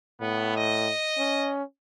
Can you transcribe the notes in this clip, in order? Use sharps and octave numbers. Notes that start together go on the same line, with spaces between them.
A2 B3
D#5
C#4